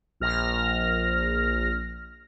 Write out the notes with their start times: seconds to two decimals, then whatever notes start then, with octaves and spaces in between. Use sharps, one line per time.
0.20 A#1 F6 A#6